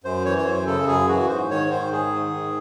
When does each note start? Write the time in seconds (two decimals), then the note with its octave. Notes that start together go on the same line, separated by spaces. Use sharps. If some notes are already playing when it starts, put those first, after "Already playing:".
0.04 F#2 C5
0.25 E3 C#5
0.38 C#5
0.45 F#2 C5
0.66 C#3 A4
0.88 F#2 G#4
1.08 E3 F#4
1.29 G#2 C5
1.50 D#3 C#5
1.71 G#2 C5
1.92 G#2 G#4
2.13 D#3
2.34 G#2